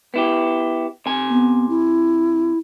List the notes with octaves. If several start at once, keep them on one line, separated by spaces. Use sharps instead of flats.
B3 E4 G4
C3 G#5
B3
E4